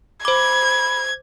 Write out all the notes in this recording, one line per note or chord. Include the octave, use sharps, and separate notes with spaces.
C5 B5 D6 G#6